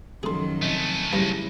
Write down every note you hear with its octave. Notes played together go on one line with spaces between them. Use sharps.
F#1 C#2 D#3 F3 F#3 G#4 A4 C6
C2 A3 C#4 D#5
G2 C#3 F#3 E4 A#6